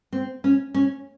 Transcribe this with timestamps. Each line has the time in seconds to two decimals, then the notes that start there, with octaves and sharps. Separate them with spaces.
0.13 C4
0.44 C#4
0.74 C#4